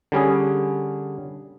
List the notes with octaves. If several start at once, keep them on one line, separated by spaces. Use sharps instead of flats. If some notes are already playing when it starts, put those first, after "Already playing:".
D3 G3 C#4 G#4